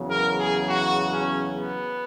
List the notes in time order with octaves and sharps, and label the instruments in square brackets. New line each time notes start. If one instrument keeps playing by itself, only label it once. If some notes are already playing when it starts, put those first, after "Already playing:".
Already playing: [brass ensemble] E2 C#3 F#3
A#4
G#4
F#4
C#4
B3